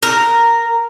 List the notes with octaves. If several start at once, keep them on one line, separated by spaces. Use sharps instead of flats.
A#4